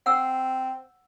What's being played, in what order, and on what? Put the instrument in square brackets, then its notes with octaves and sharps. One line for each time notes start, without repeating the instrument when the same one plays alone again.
[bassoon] C4 [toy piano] F#5 E6